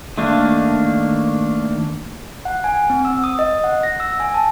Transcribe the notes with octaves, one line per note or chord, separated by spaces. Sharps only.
D#3 A3 A#3 D4
F#5
G#5
C4
E6
D#6
D#5
F#5
A#6
E6
G#5
A5